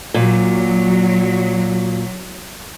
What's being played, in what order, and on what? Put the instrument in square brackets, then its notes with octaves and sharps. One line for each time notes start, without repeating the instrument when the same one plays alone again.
[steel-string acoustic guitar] A#2 [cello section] F#3